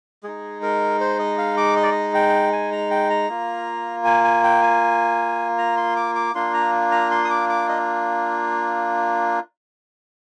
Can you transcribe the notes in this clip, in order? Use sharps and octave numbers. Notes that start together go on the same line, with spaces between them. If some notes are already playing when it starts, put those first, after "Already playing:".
G#3 D#4 G#4
A#4
C5
D#5
F5
D6
D#5
D5
D#5
G5
G#5
A#5
G5
A#5
A#3 F4
G#5
G#5
G5
G#5
A#5
C6
D6
D6
A#3 D4 F4 C6
A#5
A#5
C6
D#6
D6
D6
D#5